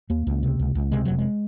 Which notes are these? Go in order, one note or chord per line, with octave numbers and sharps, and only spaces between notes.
D#2 A#3
C#2
C3
C#2
C#2
C3 G#3
F1 F#3
G#3